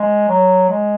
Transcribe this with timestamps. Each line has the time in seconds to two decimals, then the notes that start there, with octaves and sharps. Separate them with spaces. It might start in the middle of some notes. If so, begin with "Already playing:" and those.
Already playing: G#3
0.29 F#3
0.70 G#3